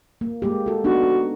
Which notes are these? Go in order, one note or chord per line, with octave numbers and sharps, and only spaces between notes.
A#3
G#3 A#3 G4
F#4 A4
B3 D4 D#4 F#4